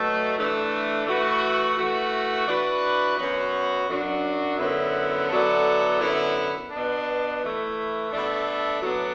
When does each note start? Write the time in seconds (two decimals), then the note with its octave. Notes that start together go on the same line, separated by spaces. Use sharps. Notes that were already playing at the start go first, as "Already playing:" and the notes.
Already playing: B2 F#3 A3 F#4 A4
0.35 E3 A3 D4 A4
1.05 E3 A3 F#4 B4
1.77 E3 A3 F#4
2.47 E3 D4 F#4 B4
3.17 F#2 F#3 B3 F#4
3.87 F#2 F#3 D4 F#4
4.58 F#2 D3 B3 E4
5.29 D3 F#3 B3 E4 A4
6.00 F#2 D3 B3 E4
6.71 B2 B3 D4
7.41 E3 A3 E4
8.11 B2 A3 D4 A4
8.82 A2 F#3 B3 D4 B4